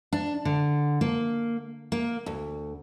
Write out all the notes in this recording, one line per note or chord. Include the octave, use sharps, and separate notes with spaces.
D4
D3
A#3
A#3
D2